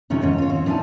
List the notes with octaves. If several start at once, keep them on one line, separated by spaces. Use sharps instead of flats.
C3 F3 A3 C#4 D#4
D#2 G#2 C#4
F4 C#5
C4 C#4
A2 F3 D4 D#4 G#5 A5